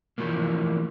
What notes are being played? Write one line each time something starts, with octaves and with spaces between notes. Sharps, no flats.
E3 F3 A3 A#3